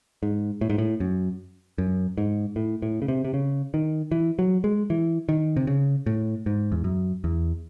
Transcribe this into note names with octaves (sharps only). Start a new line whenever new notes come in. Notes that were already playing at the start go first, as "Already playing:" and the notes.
G#2
A2
G#2
A2
F#2
F#2
G#2
A2
A2
C#3
C3
C3
C#3
D#3
E3
F#3
G#3
E3
D#3
C3
C#3
A2
G#2
E2
F#2
E2